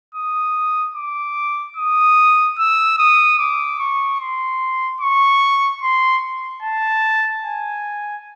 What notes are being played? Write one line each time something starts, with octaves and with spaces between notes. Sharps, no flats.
D#6
D6
D#6
E6
D#6
D6
C#6
C6
C#6
C6
A5
G#5